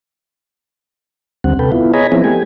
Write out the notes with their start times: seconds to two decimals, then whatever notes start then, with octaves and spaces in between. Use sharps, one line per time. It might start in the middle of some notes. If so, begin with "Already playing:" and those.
1.44 D#2 D3 G3 C4 F#5
1.59 C3 A4 B4 G5
1.72 B3 E4 F4
1.94 G#4 C#5 D#5 G#5 A#5 B5
2.12 F3 B3 C4 E4 G#4
2.24 A3 G4 G#5